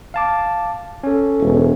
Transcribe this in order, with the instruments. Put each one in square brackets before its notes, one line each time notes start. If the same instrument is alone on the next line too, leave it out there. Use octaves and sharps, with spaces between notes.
[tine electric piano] F5 A5 D6
C#4 A4
[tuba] E1